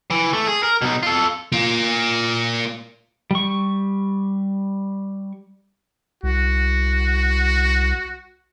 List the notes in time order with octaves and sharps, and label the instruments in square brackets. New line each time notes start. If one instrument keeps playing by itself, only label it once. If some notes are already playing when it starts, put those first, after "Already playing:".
[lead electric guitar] E3
A3
G#4
A#4
B2 D#4
F4 A4
[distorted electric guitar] A#3 F4
[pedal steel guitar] G3 C#6
[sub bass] C2 [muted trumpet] F#4